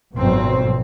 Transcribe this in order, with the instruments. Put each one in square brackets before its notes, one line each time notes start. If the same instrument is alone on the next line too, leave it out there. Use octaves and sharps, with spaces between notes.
[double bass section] G#1 F2 B2 F#3 C4